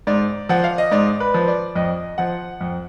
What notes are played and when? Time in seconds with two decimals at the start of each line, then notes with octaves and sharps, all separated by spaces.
0.07 G#2 D5
0.49 F3 F#5
0.64 F5
0.78 D#5
0.92 G#2 D5
1.20 B4
1.34 F3
1.48 D5
1.76 F2 D#5
2.18 F3 F#5
2.61 F2